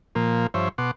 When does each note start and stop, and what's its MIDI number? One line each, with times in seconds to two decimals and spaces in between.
0.15 0.47 46
0.15 0.47 53
0.15 0.47 58
0.54 0.69 43
0.54 0.69 53
0.54 0.69 72
0.54 0.69 73
0.54 0.69 76
0.78 0.91 47
0.78 0.91 78
0.78 0.91 84
0.78 0.91 86